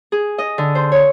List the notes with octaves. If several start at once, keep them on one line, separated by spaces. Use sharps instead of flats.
G#4
D#5
D3
C5
C#5